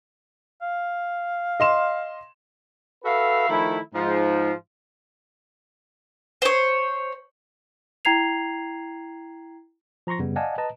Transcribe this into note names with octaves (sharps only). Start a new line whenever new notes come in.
F5
D#5 C6 E7
F#4 A4 B4 E5 F5
D#3 F3 A3 E4
G#2 F3
C5 C#5
E4 G5 A#5 G#6 C7 F7
F3 A#5 C6 C#6 A#6
F#2 C#3 G3 B3
D5 D#5 F5 F#5 G#5 A5
B4 D#5 A5 A#5